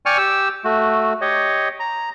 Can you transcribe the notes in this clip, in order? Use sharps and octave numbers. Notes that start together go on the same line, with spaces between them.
D5 G5 G#5 C#6 F6
G4 E6
A3 F#4
G4 C#5 D#5
A#5